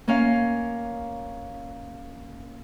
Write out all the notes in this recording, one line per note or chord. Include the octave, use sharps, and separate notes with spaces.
A#3 C#4 F5